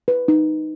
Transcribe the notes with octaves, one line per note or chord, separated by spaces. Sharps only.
B4
D#4